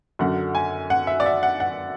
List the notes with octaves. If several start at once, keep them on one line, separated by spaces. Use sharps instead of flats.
F#2 D3 F#3 F#5
G#5
F#5
E5
D5
E5
F#5
F#5